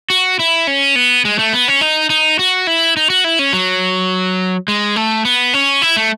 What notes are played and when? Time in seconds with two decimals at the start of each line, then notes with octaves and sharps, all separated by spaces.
0.10 F#4
0.39 E4
0.67 C#4
0.96 B3
1.25 G#3
1.39 A3
1.53 B3
1.68 C#4
1.81 D#4
2.10 D#4
2.39 F#4
2.67 E4
2.97 D#4
3.10 F#4
3.24 E4
3.39 C#4
3.53 F#3
4.68 G#3
4.96 A3
5.25 B3
5.54 C#4
5.82 E4
5.97 A3